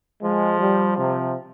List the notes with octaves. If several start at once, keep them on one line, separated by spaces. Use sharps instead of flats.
F3 G#3
G3
C3 F3